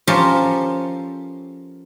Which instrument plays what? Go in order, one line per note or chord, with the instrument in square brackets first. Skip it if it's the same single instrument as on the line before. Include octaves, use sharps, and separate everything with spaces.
[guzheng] F3 C#4 G4 A4 A#4 C5